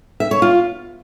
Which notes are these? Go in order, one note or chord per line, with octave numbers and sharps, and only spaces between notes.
E5
C#5
F4